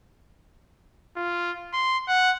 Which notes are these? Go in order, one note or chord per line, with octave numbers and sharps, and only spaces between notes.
F4
C6
F#5